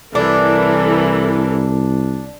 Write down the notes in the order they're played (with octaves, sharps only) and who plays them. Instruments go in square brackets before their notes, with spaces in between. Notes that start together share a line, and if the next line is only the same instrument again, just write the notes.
[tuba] C2 [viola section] E3 A4 A#4 [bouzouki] D4